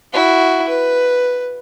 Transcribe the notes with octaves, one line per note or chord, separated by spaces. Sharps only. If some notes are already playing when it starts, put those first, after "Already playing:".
E4 F#4
B4